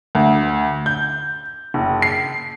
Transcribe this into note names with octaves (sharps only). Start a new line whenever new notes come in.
D2
G6
F#1
C7